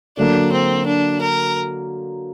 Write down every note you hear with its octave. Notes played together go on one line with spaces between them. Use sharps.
D3 F#3 A#3 D4
C4
D4
A#4